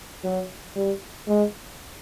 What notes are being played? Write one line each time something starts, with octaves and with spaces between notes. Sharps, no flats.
F#3
G3
G#3